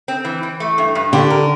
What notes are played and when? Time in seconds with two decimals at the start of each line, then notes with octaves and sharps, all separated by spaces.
0.08 C4
0.25 E3
0.43 E3
0.60 A3
0.78 G2
0.95 G2
1.13 D3 G4
1.30 A#4